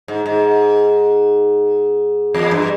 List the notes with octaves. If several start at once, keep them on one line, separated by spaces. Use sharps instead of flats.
G#2
G#2
E2
G2